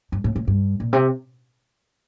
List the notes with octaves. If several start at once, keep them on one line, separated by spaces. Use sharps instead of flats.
G2
A2
A2
G2
A#2
C3